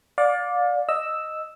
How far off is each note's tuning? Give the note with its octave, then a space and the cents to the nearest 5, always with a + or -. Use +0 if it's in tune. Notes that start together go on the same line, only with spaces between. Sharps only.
D5 -5 F5 +35
D#5 +0 E6 +0